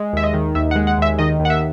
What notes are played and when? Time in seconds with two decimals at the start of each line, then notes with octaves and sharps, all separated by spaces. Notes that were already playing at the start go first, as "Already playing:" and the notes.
Already playing: G#3
0.13 D#2 E5
0.24 D#5
0.34 D#3
0.55 D#2 E5
0.71 F#5
0.76 G#3
0.87 F#5
0.97 D#2 E5
1.19 D#3 D#5
1.40 D#2
1.45 F#5
1.50 E5